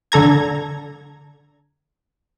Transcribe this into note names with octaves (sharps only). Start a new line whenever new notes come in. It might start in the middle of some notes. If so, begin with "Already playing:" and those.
D3 A4 A#5 G#6